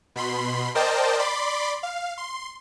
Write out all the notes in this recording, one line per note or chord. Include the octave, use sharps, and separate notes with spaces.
B2 B5 C6
A#4 C5 D5 D#5 G5 A5
D5 B5 C6 D6
F5
C6